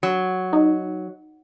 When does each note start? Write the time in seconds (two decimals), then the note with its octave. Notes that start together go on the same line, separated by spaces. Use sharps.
0.03 F#3
0.53 D#4